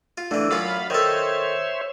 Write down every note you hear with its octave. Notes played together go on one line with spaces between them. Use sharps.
F4
D3 E3 A3 D4
F#2 C#4 F4 F5 B5
D#3 A4 C5 C#5 E5